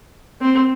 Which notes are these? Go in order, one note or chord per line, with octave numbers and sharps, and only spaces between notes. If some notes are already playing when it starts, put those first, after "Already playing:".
C4